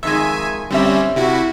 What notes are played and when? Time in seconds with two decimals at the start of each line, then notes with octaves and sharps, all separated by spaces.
0.03 F2 D#3 G#3 E5 G#5
0.70 D3 G3 C4 C#4 E5
1.16 C3 E4 F#4